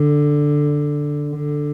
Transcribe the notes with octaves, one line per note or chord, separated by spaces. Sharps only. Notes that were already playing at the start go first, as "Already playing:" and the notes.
Already playing: D3
D3